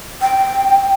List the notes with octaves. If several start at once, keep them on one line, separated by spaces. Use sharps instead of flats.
G5